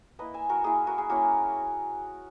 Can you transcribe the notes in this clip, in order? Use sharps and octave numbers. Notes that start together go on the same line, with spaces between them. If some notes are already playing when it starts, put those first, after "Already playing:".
A#3 E4 B4 D#5
E5 G#5
F#4 A#4
A#3 E4 G#4
F#4 A#4
G#4
A#3 C#4 E4 F#4